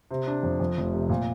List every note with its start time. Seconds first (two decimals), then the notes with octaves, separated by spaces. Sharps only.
0.11 C3
0.27 D4
0.43 F2
0.60 F2
0.77 F1
0.94 C3
1.09 A#2